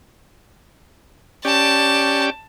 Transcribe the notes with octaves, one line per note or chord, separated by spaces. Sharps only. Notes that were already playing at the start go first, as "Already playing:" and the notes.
C#4 G4 D5 A5